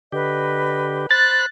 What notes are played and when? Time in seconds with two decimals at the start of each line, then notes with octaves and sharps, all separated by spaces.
0.12 D3 G4 B4 D#5
1.11 C5 B5 F#6 A6